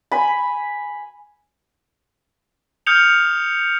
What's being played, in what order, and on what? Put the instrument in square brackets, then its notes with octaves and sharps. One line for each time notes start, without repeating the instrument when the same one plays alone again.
[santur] G#5 B5
[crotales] D#6 F6 G6 C#7 F7